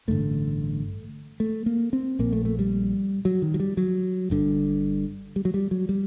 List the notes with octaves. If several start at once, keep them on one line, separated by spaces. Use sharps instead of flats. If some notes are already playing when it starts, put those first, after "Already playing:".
A1 G2 D3 A3
A3
A#3
C4
A#1 A#2 A#3
A3
A3
G3
F#3
D#3
F#3
G3
F#3
G1 G2 D3
G3
F#3
G3
F#3
G3